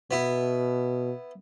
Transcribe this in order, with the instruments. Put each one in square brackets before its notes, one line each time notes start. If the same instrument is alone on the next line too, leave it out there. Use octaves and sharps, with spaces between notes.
[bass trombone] B2 [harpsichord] B3 E4